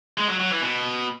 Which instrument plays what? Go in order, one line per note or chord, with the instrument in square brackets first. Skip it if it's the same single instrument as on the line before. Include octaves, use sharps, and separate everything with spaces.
[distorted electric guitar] G#3
F#3
F#3
E3
B2